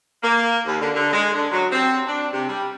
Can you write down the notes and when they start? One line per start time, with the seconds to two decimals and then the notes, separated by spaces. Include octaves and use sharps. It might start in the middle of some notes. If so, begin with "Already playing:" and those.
0.23 A#3
0.66 D#2
0.80 D3
0.94 D3
1.13 G#3
1.34 D3
1.51 F#3
1.71 C4
2.07 D4
2.33 C3
2.48 G3